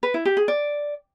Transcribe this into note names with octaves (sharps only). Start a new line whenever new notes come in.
B4
E4
G4
G#4
D5